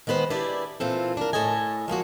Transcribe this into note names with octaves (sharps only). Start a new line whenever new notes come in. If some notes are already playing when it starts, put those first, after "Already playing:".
D#3 G#3 B3 B4 C5
D4 E4 G4 G#4 B4 D5
A#2 E3 C4 F4 A4
D4 A#4
A2 A4 C#5 D#5 G#5
F3 G#3 A#3 F#4